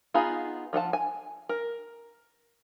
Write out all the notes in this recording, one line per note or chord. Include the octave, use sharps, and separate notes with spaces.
B3 D#4 F4 G#4 B5
F3 F4 F#5 A5
G#5
A#4